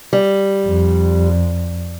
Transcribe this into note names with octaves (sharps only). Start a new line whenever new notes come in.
G3
F2